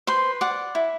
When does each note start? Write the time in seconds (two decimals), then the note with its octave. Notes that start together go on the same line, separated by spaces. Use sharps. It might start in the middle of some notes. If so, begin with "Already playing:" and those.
0.07 B4 C5 C6
0.41 D5 F#5
0.75 E4